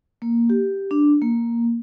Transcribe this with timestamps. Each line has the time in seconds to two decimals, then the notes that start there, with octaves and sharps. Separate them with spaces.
0.22 A#3
0.50 G4
0.91 D4
1.21 A#3